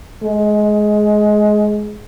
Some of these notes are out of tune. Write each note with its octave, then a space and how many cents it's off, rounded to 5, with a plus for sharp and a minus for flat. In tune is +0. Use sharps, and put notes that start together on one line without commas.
G#3 +15